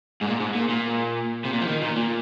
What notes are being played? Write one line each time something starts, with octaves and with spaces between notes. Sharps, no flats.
G#2
A#2
G#2
A#2
A#2
C3
A#2
F3
D#3
A#2
A#2